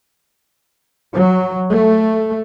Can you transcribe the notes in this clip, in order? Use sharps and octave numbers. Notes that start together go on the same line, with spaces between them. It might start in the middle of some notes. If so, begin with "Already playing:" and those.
F#3
A3